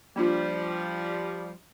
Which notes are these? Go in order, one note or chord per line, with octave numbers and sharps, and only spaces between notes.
F3 G3 A#3 D4 F4